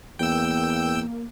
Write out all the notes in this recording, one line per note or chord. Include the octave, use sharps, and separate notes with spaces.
E2 A#3 G5 E6